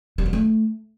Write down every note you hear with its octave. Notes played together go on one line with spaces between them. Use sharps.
G3
F#3
A3